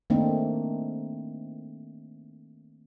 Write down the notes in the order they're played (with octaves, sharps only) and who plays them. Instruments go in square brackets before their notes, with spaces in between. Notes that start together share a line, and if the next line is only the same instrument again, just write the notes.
[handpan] D#3 A3 A#3 C4 D4 D#4